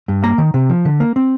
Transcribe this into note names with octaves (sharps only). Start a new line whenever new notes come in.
G2
A#3 A#5
D#3
C3
F3
D3
A#3
C4